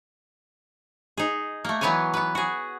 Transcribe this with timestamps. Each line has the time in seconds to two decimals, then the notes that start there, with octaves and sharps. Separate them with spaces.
1.17 D#4 G#4
1.64 A3 A#3
1.81 E3 F#3 B3 B4 C#5 G#5
2.14 B3 B4
2.35 F#4 G#4